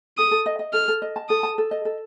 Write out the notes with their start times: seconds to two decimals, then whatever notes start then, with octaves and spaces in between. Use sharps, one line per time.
0.17 A4 D#6
0.31 A4
0.46 D#5
0.59 D#5
0.73 A4 F6
0.88 A4
1.02 D#5
1.16 A5
1.29 A4 D#6
1.43 A5
1.58 A4
1.71 D#5
1.85 A4